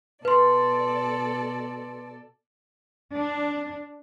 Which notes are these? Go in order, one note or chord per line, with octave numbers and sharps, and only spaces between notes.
B2 A4 B4 D5 C6
D4